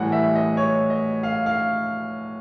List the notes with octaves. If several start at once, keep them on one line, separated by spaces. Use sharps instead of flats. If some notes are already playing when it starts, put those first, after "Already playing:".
Already playing: A2 E3 G3 F#5
E5
D#5
C#5
D#5
F5
F5